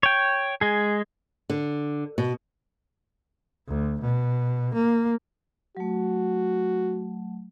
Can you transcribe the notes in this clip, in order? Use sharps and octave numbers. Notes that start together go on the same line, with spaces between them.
C#5 G5
G#3 G#4
D3
B2
D2
B2
A#3
F#3 A3 F#4